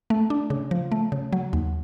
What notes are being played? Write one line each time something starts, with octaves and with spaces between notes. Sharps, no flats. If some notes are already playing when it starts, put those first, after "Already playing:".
A3
D4
C#3
F3
A3
C#3
F#3
D#2